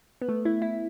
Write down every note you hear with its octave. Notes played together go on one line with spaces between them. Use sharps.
B3
A3
E4
E4